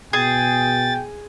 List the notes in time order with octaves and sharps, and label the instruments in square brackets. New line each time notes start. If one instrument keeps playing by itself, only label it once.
[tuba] B2 [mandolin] G#4 [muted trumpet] G5 [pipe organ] A6